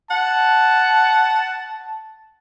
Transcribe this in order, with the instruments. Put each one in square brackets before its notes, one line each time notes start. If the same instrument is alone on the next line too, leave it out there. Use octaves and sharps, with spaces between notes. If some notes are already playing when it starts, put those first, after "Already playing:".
[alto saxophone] F#5 [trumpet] A5